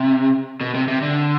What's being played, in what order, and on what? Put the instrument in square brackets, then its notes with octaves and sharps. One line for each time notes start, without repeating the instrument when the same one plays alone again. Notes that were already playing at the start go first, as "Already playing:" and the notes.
Already playing: [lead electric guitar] C3
B2
C3
C3
D3